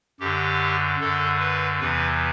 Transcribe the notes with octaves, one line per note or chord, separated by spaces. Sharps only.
F#2 D3 G4
F#2 D3 A4
B4
E2 C3 E3 B4